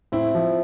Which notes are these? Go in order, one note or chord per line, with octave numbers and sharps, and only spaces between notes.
A2 C4 E4
F3